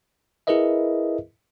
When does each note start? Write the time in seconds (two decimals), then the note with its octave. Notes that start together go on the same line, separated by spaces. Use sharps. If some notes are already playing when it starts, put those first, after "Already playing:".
0.47 E4 G#4 A#4 B4 D#5 E5